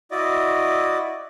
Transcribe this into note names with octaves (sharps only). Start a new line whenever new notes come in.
E4 F#4 D5 D#5